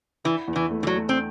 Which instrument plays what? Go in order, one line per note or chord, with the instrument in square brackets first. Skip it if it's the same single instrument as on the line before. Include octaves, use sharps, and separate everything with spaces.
[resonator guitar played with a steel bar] E3 [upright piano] E4
[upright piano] E2
[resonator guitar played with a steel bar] E3
[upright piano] A3
[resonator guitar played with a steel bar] E3
F#3
[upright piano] A3
[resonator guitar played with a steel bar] C4